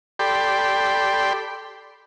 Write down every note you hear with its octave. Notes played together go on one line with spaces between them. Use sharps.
G4 A4 D5 G5 B5 C6